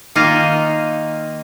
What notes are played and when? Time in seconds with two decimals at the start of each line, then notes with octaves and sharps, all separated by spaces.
0.15 D#3 A#3 D#4 F4 D#5 F5